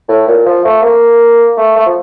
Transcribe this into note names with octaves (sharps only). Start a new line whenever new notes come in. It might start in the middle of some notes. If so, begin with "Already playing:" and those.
A2
A#2
F3
A3
A#3
A3
A3
F3